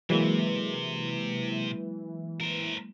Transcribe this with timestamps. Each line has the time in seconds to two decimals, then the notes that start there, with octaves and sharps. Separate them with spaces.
0.10 C3 E3 F#3 G#3 A#3
2.41 A#4 C5